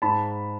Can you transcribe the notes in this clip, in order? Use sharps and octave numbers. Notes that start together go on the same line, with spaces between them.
G#2 A5 B5